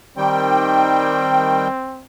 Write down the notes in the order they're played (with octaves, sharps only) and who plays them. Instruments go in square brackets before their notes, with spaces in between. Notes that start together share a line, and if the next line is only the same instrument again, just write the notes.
[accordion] D#3 G3 G5 [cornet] C4